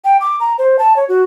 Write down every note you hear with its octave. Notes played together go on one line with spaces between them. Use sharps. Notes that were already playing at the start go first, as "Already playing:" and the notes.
G5
D6
A#5
C5
A5
C#5
F#4